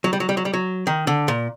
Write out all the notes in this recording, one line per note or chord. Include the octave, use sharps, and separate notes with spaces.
F#3
G3
F#3
G3
F#3
G3
F#3
D#3
D3
A#2